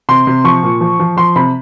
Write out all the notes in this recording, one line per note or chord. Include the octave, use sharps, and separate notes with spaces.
C3 C6
C3
F3 C#6
A#2
F3
F3
F3 C6
C3 B5